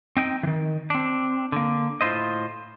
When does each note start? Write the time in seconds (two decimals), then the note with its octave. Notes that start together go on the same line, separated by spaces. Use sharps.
0.17 C4 D#4 G5
0.43 D#3 E3
0.90 C4 D4
1.52 D3 A#3
2.01 A2 E4 F4 C5 D#5